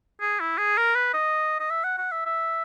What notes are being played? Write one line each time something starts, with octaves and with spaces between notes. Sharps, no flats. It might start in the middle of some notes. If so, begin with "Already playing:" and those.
G#4
E4
G#4
A#4
B4
D#5
D#5
E5
F#5
F#5
E5
E5